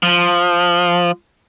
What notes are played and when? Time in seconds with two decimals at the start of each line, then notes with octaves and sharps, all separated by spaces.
0.03 F3